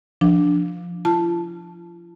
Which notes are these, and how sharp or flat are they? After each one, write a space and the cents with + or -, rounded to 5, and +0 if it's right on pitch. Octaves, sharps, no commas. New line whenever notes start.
F3 +0 D4 -5
F4 -45 A5 +0